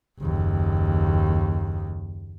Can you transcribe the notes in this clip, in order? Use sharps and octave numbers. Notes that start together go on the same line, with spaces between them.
F#1 D#2